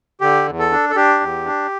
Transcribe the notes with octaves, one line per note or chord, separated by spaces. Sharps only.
D3 G4
E2
A4
D4
A4
D4 G4
E2
D4